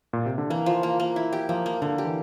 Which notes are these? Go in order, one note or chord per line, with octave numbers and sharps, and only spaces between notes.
A#2
C3
D3
E3 A#3
F3
A#3
A#3
E4
G4
F3 A#3
A#3
D3 A#3
G4
E3